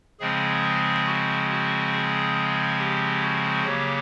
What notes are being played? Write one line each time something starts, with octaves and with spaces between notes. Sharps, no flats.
C#3 F3 G#3 C4 G#4
F#4
F#4
G#4
G4
F#4
C#3 F#3 A#3 G4